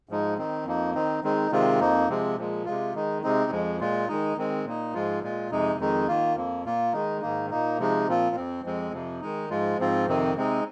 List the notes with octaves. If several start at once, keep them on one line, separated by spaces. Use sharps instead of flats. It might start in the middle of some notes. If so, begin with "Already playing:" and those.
G#2 F3 G#3 D#4
D#3 C4 D#4
F2 F3 A#3 D#4
D#3 C4 D#4
D#3 G#3 C4 D#4
C3 D#3 G#3 C4 F4
F2 F3 A#3 D#4
C3 F3 G#3 C4
A#2 F3 G#3
C3 G#3 F4
D#3 G#3 D#4
C3 G#3 C4 D#4
F2 F3 G#3
A#2 G#3 F4
D#3 G#3 D#4
D#3 G#3 C4
A#2 A#3 D#4
G#2 F3 G#3 F4
A#2 G#3 F4
F2 C3 G#3 D#4
F2 D#3 G#3 D#4
D#3 A#3 F4
F2 F3 A#3
A#2 A#3 F4
D#3 G#3 D#4
G#2 D#3 A#3 D#4
A#2 A#3 D#4
C3 F3 G#3 D#4
A#2 F3 C4 F4
F2 F3 C4
F2 F3 G#3 C4
F2 C3 F3
D#3 G#3 D#4
G#2 F3 G#3 F4
G#2 F3 C4 F4
F2 C3 D#3 C4
C3 G#3 C4 D#4